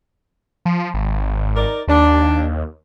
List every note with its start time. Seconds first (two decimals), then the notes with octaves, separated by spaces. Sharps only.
0.65 F3
0.94 G#1
1.56 D#4 A#4 D5
1.88 D#2 D4